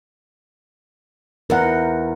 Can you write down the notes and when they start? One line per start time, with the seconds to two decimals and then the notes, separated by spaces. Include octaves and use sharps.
1.50 E2 D#4 A#4 F#5